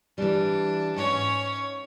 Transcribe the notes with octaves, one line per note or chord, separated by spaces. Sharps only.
E3 G3 D4
G#2 C#4 C#5